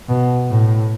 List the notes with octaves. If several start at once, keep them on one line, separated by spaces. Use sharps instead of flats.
B2
A2